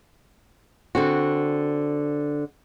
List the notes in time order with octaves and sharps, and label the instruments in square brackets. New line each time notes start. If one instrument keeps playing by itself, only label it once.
[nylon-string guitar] D3 C4 F#4